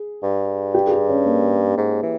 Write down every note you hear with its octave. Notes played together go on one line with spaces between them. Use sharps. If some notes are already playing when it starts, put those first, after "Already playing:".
Already playing: G#4
G2
G4
G#4
G4
C#4
A#3
G#2
E3